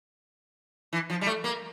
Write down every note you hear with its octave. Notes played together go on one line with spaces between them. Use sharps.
E3
F3
G3
A3
A#3